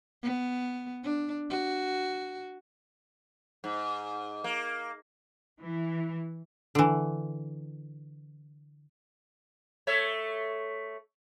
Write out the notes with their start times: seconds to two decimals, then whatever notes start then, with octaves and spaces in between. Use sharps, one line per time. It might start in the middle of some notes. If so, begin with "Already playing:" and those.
0.22 B3
1.03 D4
1.50 F#4
3.64 G#2
4.44 A#3
5.60 E3
6.75 D3 E3
9.87 A3 C#5 E5